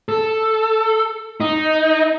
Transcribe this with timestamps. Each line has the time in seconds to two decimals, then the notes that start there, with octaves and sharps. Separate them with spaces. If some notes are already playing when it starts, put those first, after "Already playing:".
0.09 A4
1.40 D#4